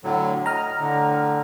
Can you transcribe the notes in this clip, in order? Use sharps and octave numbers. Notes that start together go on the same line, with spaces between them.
A2 D3 F#3
D#5 A#5 F6
A2 D3